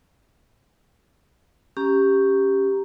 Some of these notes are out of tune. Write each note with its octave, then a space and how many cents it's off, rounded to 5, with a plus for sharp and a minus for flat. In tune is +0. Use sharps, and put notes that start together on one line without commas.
C#4 +0 G4 +0 A#5 +0